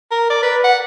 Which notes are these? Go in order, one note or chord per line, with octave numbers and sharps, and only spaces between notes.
A#4
D5
B4
F#5